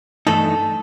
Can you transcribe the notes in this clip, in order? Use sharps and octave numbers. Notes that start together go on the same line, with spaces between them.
G2 E3 A3 D#4 A4